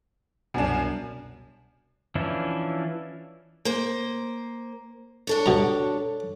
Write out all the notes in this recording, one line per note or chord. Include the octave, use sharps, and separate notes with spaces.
C2 F#2 B2 D4
E3 F3 C#4 D4 E4
A#3 C5
D4 A4 C#5
B2 A#5